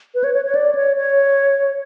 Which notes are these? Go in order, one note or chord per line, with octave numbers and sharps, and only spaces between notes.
B4
C#5
C#5
C#5
D5
C#5
C#5